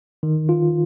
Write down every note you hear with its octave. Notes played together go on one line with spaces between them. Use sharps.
D#3
F4